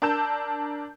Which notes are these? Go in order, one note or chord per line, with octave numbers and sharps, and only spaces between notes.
D4 A#4 A5 E6 G6 E7